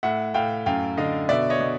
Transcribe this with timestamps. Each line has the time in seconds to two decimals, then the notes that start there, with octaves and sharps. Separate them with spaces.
0.03 A2 E5 F#5
0.34 A2 F5 G5
0.66 F#2 F5 G5
0.97 D3 D#5 F5
1.29 B2 D5 E5
1.50 C#5 D#5
1.60 B2